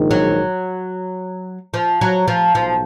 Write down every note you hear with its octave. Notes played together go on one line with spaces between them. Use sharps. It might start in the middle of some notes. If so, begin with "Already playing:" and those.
Already playing: A#1 G#2 D#3
F#3
F3
F#3
F3
B1 F3